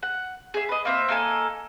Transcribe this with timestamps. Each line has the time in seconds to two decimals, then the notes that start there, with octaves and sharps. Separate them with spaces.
0.03 F#5
0.54 G#4 E5
0.69 B4 D#5
0.85 A#3 C4 E5
1.08 A#3 D#4 A4 G#5